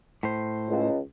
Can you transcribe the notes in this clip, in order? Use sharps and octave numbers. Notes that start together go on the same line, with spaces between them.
A2 C5
C#2